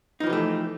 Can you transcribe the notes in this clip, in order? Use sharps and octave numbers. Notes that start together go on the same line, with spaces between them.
E3 F3 A3 D#4 G4